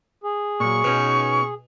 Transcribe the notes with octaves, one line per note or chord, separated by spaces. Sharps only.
G#4
A#2 F#3 C#6
B2 B3 C#4 D#4